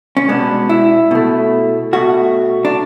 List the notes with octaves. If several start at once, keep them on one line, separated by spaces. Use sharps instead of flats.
C#4
B2 G#3 B3 D4
E4
B2 A3
B2 A3 F#4
D4